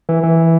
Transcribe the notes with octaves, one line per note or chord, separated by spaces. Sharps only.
E3
E3